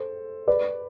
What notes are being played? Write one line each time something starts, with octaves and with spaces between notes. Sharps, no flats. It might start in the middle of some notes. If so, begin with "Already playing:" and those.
Already playing: A4 C5
B4 D5